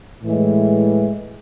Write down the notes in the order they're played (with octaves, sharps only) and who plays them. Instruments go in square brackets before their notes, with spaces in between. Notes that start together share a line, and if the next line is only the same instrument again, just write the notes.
[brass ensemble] A2 E3 G#3